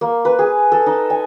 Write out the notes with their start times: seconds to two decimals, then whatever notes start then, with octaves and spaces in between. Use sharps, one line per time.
0.01 A#3
0.25 B4
0.39 G#4
0.72 A4
0.86 D#4
1.10 G#5